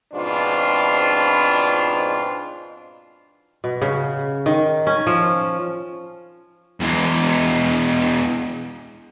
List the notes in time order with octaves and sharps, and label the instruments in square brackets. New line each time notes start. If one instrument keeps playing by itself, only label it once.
[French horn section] G#2 B2 F3 C4 D4 F4
[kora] B2
C#3
D#3
C#4
F3
[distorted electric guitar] E2 G#3